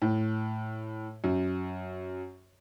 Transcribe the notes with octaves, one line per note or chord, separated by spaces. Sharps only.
A2
F#2